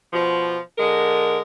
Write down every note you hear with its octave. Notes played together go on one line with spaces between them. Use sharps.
B2 F3
D3 G#3 A#4